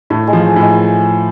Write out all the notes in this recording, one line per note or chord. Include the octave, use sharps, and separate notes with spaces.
A2 A3
G#3
F3
A3
A2 G#3
A#3